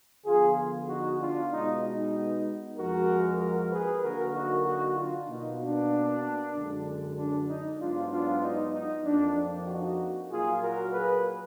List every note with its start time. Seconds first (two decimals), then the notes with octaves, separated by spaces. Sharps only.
0.25 D3 F3 B3 F4 G#4
0.88 D#4 F#4
1.20 D4 F4
1.52 B2 G#3 B3 D#4
1.82 D#4
2.77 F2 F3 G#3 F#4 A#4
3.40 F#4 A#4
3.70 G#4 B4
4.02 D3 F#3 A#3 F#4 A#4
4.34 D#4 F#4
4.65 D#4 F#4
4.96 D4 F4
5.27 B2 A#3 D#4
5.59 D4
6.54 F#2 D3 G#3
7.16 D4
7.47 D#4
7.80 G#2 F#3 B3 D4 F4
8.10 D4 F4
8.42 D#4
8.73 D#4
9.04 F2 F3 A#3 D4
9.67 D#4 F#4
10.30 A#2 F#3 A#3 F4 G#4
10.62 F#4 A#4
10.93 G#4 B4